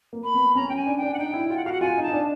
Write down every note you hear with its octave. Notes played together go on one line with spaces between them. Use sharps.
A#3
B5
B3
C#4 A#5
C#4 G5
G#5
D4
D4 G5
F#5
D#4 G5
E4
F4 G5
F#5
F#4 F5
F#5
F4 G#5
D#4
A5
D#4
D4